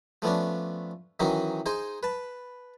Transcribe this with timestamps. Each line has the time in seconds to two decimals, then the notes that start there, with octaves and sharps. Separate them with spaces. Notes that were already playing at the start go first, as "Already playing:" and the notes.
0.22 F3 A3 B3 C#4 D4
1.20 D#3 E3 F#3 C#4 D#4
1.66 D#4 G#4 C5 G#5 C6
2.03 B4 A5